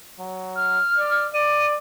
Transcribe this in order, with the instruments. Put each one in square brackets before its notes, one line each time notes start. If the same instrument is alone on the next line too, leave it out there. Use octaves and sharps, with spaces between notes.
[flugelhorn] F#3
[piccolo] F6
[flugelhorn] D5
[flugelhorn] D5 [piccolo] D#7